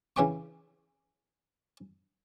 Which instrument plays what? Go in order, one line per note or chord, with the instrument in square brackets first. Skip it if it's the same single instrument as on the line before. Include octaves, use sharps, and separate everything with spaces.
[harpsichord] C#3 E3 G4 G5 C#6